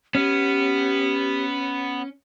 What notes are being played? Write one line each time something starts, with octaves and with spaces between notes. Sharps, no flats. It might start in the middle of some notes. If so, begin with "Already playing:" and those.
B3 C#4 G4